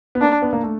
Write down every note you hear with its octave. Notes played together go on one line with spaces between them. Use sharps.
B3
A#3 D4
B3
A#3
A3